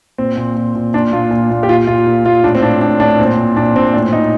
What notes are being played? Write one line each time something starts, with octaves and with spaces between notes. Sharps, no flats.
A#2 C4
A#2
A#2
A#2
A#2 D4
A#2 F4
A#2
A#2
G4
A#2 F4
A#2 F4
A#2
A#2 F4
A2 D4
C4
A2 D4
A2 D4
A2 D4
A#2 C4
A#2
A#2 D4
A#2 C4
A2 D4
A2 D#4